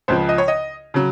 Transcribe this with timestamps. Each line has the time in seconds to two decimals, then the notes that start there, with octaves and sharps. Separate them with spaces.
0.08 C#2 C#3 F3 C5
0.29 D#5
0.38 C#5
0.48 D#5
0.94 C#3 F#3